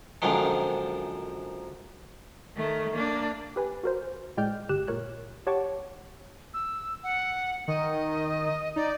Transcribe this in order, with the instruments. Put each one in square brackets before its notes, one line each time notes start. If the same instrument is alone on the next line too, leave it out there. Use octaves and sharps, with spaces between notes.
[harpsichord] A#1 F#2 D3 D#3 F3 G#3
[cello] D#3 A3
A#3 D4
[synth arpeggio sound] G4 B4 G#5
F#4 A#4 C5
A2 G#3 D5 G5 F6 G6
G1 G4 F#6 E7
A#2 A#4 C#5 F#6
G4 C#5 F#5 A5 C#6 D6
[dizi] E6
F#5
[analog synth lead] D#3 [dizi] D#5
[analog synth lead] D#4 [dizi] D5